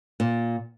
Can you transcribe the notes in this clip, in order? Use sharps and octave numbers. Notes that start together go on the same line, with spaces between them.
A#2